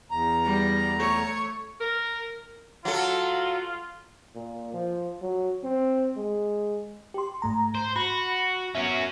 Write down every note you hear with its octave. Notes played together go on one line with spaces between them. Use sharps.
E2 A#5
G3
A3 C#5
A#4
F#3 F4 A4
A#2
F3
F#3
C4
G#3
G4 C6
G#2 A3 A#5
C5
F#4 B5
B3 C#4 F#4 E5